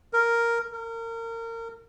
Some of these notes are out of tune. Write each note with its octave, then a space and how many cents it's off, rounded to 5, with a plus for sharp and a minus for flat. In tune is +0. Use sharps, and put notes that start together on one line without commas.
A#4 +0
A#4 -30